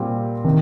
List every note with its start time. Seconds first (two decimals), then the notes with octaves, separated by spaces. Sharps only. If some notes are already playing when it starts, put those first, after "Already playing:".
Already playing: A#2 G3 C4
0.44 C3 D#3